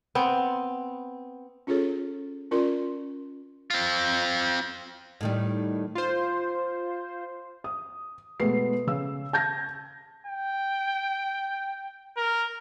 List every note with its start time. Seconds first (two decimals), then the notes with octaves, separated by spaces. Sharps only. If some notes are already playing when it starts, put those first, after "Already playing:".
0.15 B3 C4
1.67 C#4 F4 G#4 A4 C#5
2.51 C#4 F4 A#4 D5 C6
3.70 C4 F4
5.21 A2 D#3 G3
5.95 F4 C5
7.64 D#6
8.40 B2 G#3 A3 B3 C7
8.87 C#3 E6
9.33 A5 G6 G#6 A#6
10.27 G5
12.17 A#4